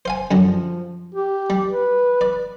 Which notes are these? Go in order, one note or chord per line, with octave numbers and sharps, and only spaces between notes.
C5 F5 G#5
F#2 D3 F3 F#3
G4
G3
B4
D5